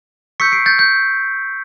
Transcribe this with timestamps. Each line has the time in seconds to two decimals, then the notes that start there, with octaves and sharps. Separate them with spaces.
0.40 C#6 E6 G6 B6 C#7
0.52 C7 D7
0.66 G6 A6
0.79 G6